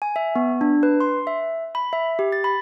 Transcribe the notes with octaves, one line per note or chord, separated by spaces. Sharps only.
G#5
E5
B3
D4
B4
C6
E5
B5
E5
G4
A6
B5